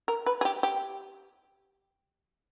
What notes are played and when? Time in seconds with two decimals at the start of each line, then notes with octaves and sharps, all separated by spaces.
0.08 A#4
0.26 B4
0.41 G#4
0.45 G4
0.63 G4